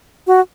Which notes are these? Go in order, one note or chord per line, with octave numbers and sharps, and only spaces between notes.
F#4